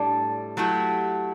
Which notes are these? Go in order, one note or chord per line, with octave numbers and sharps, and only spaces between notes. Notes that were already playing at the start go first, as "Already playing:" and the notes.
Already playing: A2 G3 D4 A4
F#3 A3 E4 G4